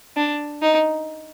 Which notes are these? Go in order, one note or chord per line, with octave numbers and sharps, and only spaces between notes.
D4
D#4